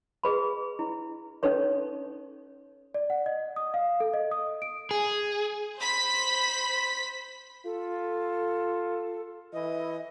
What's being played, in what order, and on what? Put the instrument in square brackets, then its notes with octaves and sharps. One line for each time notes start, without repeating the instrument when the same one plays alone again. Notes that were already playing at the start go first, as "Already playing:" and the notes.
[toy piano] G#4 B4 B5
E4
C#4 D#4 A4 B4 C#5
[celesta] D5
F#5
D#5
D#6
F5
A4
D#5
D#6
D7
[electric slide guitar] G#4
[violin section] C5 B5 B6
[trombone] F4 [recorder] A4
[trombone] E3 [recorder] D#5